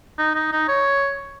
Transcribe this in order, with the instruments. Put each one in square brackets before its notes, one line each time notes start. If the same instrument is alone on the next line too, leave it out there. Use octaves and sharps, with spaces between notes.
[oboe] D#4
D#4
D#4
C#5